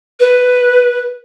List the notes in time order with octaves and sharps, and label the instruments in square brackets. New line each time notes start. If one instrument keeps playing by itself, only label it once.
[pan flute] B4